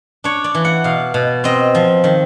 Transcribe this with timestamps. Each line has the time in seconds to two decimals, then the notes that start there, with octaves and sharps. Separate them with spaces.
0.24 D4 C#5
0.44 D5
0.55 E3
0.65 F#5
0.84 B2 F5
1.14 B2
1.44 C4 D#5
1.75 F3
2.04 D#3